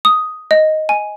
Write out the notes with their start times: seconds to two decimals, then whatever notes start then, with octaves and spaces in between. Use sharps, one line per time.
0.05 D#6
0.51 D#5
0.89 G#5